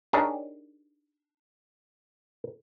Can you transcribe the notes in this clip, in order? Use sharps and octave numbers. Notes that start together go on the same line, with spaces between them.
D4 D#4 G4 G#4 A#4 C#5